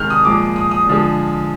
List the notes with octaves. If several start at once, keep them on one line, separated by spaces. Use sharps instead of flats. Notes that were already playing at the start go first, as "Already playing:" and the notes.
Already playing: C3 D#3 G#3 F6 G6
D#6
A#2 F3 G#3 D6
D#6
D#6
D3 F3 G#3